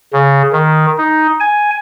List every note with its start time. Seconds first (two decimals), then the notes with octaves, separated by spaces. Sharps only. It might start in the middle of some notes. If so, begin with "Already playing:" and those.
0.13 C#3
0.53 D#3
0.98 D#4
1.40 G#5